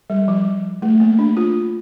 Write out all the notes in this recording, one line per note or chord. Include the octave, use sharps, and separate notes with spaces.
G3
F3
A3
A#3
D4
F4